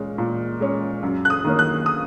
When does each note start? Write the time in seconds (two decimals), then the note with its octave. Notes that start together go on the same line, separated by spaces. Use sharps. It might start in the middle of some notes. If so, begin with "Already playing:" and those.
Already playing: A#2 G#3 C#4
0.18 A#2
0.60 G#3 C#4
1.03 F#2
1.25 F#6
1.30 D#6
1.44 D#3 A#3 C#4
1.59 F#6
1.86 D#6